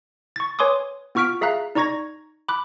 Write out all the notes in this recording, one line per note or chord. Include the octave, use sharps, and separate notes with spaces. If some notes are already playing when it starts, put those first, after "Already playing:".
C#6 A6
B4 C#5 G#5 C6 D6 D#6
B3 F4 C#6 F6 B6 D7
G#4 E5 F5 A#5 F#6
D#4 D5 A#5 C#6 G#6 A#6
B5 D6 F#6